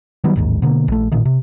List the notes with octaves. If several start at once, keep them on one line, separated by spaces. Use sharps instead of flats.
D#3 F#3 G3 B3
A1 D#2 G#2
B2 D3 A#3
A#1 A3
A1 A#2 D#3
C3